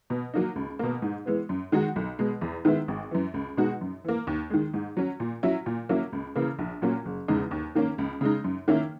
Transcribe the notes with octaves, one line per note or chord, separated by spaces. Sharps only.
B2
F#3 A#3 D#4
C#2
B2 A#3
G#2
E3 G#3 B3
F#2
D#3 G#3 D#4 F#4
B1
B2 G#3
E2
D#3 G#3 B3 E4
G#1
F#2 E3
C#2
B2 G#3 D#4 F#4
F#2
E3 A#3
D#2
D#3 G#3
G#2
F#3 C#4
A#2
F#3 C#4 E4
A#2
F#3 A#3 C#4 E4
C#2
C#3 E3 A#3
A#1
A#2 F#3 A#3 C#4
F#1
E2 C#3 G#3 D#4
D#2
D#3 A#3 C#4
C#2
C#3 G#3 D#4
F#2
D#3 A#3 C#4 E4